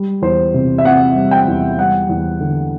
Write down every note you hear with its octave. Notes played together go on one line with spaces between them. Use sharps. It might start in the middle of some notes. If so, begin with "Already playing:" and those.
Already playing: G3
E2 C5
C3
E5
C4 F#5
G3
G5
E2
G3 F#5
E2
D3